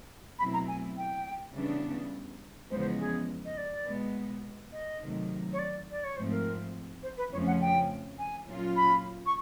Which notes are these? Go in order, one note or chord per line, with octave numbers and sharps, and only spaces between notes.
B2 F#3 A3 C4 E4 B5
A#5
G#5
G5
C#3 E3 G3 B3 D4
E2 C#3 F3 G#3 B3 C5
C5
G#4
D#5
D5
B2 G#3 B3
D#5
C3 D#3 F#3 A3
C#5
D5
D5
C#5
G#2 F3 A3 C4 C5
A#4
C5
B4
F2 C#3 F3 A3 C#4 C#5
F#5
G5
G#5
A#2 F#3 A#3 C#4 F4
B5
C#6